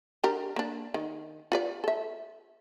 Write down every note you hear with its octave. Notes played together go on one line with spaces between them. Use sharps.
D4 G4 A#4
A#3 D4
D#3
F4 B4 D5
A4 E5